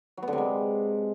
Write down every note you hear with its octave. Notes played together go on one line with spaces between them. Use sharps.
F#3
B3
D3
C3
G#3